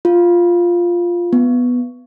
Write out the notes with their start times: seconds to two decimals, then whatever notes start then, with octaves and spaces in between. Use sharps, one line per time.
0.05 F4
1.33 B3